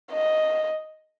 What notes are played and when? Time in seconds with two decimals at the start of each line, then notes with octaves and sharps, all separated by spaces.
0.12 D#5